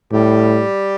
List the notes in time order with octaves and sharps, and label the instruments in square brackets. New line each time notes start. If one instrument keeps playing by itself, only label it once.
[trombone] A2 [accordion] G3 G4